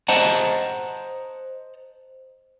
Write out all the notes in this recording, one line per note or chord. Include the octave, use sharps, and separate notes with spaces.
C5 D#5 F#5 A5 A#5